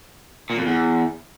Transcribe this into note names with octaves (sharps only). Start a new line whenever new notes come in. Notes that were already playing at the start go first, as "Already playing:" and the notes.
A#2
F2
E2